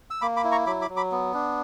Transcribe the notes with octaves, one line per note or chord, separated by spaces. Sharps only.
E6
A#3 B5 D6
B5 D6
E4
A#5 C#6
F#3 B5 D6
B5 D6
F#3
B5 D6
B3
D4